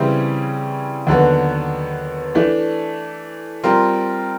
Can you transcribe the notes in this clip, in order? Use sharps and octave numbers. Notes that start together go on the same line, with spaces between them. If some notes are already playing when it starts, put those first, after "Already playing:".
Already playing: C#3 E3 G3 C4 E4
D#2 D3 F#3 B3
E3 A3 D4
G3 C4 F4 A#4